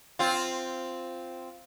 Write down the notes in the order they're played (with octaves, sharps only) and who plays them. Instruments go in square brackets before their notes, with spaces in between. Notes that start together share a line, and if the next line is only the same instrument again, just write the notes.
[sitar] C4 F4